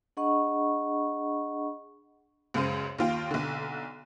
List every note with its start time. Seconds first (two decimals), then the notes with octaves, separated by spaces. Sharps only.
0.17 D4 G#4 D#5 F#5 B5 C#6
2.54 C#2 F#2 C#3 C5 D#7
2.98 D#2 F4 G5
3.31 B1 D3